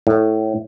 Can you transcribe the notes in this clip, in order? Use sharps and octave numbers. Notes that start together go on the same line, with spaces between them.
A2